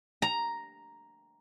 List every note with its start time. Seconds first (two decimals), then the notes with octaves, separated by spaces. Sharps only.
0.22 A#5